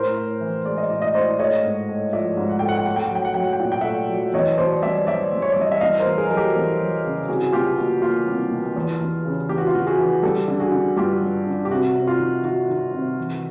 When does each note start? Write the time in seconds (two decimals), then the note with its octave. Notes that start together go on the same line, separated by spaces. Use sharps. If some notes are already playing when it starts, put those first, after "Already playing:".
Already playing: A2 A#4 C5
0.17 A2
0.41 E3
0.65 G#3 D5
0.77 D#5
0.89 A2 D5
1.02 D#5
1.15 A2 C5 D5
1.39 A3 C#5 D#5
1.63 G#2
1.89 A3
2.13 F3 D5 E5
2.37 G#2
2.49 F#5
2.59 A3 G5
2.69 F#5
2.78 G5
2.87 A3 F#5
2.96 G5
3.06 F#5
3.11 F#3 G5
3.25 F#5
3.34 F#3 G5
3.44 F#5
3.53 G5
3.60 A#2 F#5
3.72 G5
3.81 A3 E5 F#5
4.09 F#3
4.33 E2 C#5 D#5
4.58 B2 C5 D5
4.82 G3 D5 E5
5.07 G3 D5 E5
5.33 G3
5.42 C#5
5.52 G3 D5
5.61 D#5
5.72 E5
5.81 E2 D#5 F5
6.00 A#4 C5
6.05 E2
6.18 G#4 A#4
6.30 F#3 A#4
6.36 G4 A4
6.55 E2
6.79 F#3
7.04 C#3
7.28 C2 F#4 G#4
7.41 G#4
7.52 B2 F4 G4
7.78 A#3 F#4
8.02 A#3 F4
8.27 C2
8.51 B2
8.76 E2
9.00 E2
9.25 C#3
9.49 E2 G4
9.58 F#4
9.67 F4
9.74 E2 F#4
9.87 F#4 G#4
9.98 E3
10.23 G3 G4 A4
10.48 D3
10.60 F#4 G#4
10.72 D3
10.96 G2 F4 G4
11.22 G3
11.47 D3
11.65 G4
11.70 C3 F#4
11.95 C3
12.07 F4
12.19 D#3
12.44 D#3 F#4
12.69 D#3
12.94 C3
13.18 E3